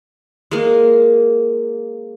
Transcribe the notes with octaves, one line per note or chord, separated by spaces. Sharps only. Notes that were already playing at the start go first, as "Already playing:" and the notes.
G#3 A#3